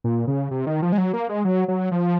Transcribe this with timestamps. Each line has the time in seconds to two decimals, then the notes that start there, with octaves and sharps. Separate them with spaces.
0.04 A#2
0.27 C#3
0.51 C3
0.67 D#3
0.82 F3
0.92 G#3
0.98 F#3
1.13 A#3
1.29 G#3
1.45 F#3
1.68 F#3
1.91 F3